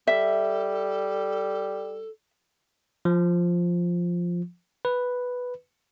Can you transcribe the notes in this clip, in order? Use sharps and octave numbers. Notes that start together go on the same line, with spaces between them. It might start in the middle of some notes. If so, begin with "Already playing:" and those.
G3 A4 E5
F3
B4